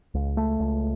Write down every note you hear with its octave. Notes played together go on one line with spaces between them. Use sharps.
C#2
A3
C#2